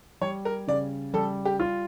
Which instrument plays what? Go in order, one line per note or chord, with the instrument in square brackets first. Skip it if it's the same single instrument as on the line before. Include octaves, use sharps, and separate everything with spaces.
[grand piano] G3 [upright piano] C#5
[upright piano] A#4
[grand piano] C#3 [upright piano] D5
[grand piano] G3 [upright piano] A4
[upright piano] G4
[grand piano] F4